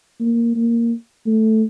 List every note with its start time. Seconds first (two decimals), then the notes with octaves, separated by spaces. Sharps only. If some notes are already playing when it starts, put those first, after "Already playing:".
0.20 A#3
0.56 A#3
1.26 A3